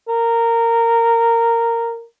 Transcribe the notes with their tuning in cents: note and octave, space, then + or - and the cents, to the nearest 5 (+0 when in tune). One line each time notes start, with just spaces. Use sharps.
A#4 -15